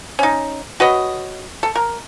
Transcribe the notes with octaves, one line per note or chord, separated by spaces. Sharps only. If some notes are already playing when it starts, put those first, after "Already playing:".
C#4 D#4
F#4 B4 C#5 D#5
A4
A#4